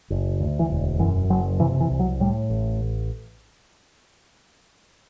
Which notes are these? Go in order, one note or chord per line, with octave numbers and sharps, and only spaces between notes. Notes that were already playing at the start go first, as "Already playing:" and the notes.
F#1
D2
E3
E1
F#2 E3
F#1 F#3
C3 E3
E3
C2
F#3
A2 G3
A1